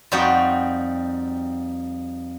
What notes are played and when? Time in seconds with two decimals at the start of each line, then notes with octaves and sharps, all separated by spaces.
0.12 F2 G3 D#4 F#4 G5